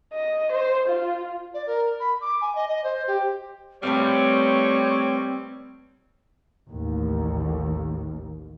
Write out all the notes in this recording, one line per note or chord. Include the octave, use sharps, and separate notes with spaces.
D#5
C5
F4
D5
A#4
B5
D6
G#5
D#5
D#5
C5
G4
G3 A3 C4 B4 C#5 F5
A1 D#2